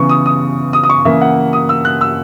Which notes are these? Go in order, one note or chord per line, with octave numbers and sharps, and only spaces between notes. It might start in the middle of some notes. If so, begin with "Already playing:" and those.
Already playing: C#3 E3 B3 C#6
D#6
D#6
D#6
D#6
C#6
C#3 E3 A#3 E5
F#5
D#6
E6
F#6
E6